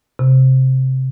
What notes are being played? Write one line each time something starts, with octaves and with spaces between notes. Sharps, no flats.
C3